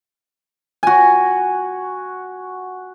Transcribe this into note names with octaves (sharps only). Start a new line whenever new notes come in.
F#4 G#5